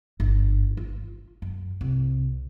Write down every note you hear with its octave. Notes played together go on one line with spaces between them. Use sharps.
G1
F4
F#2
C2